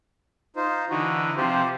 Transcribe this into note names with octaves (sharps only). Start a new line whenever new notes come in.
D#4 F4 C5
D3 E3 D#4 F#4
C3 F3 G4 C5